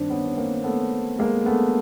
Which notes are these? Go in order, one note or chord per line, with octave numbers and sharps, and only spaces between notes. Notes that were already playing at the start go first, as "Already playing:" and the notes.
Already playing: G2 D#3 C4 D4
B3 C#4
C#4
A#3 C4
A3 B3
G#3 A#3
A3 B3